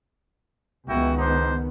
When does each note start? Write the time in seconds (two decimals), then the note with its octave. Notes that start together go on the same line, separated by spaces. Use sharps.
0.87 C#2 D#3 B3 E4 F#4 G5
1.17 D4 D#4 C5